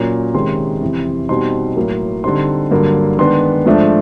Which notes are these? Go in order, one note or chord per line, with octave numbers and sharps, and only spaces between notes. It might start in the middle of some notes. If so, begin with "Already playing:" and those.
Already playing: A#2 F#3 A#3 C#4 A#5
C3 D#3 G#3 C#4 C6
F2 C3 E3
B2 G3 C4 D#4 C6
A2 F#3 A#3
D3 G3 C4 D#4 C6
G2 D3 F#3 A#3
D#3 G#3 B3 D4 C6
G#2 F3 A3 D4